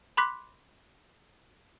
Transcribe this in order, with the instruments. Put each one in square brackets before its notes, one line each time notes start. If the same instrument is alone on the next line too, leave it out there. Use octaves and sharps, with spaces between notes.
[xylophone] B5 C6 D6 F#6 B6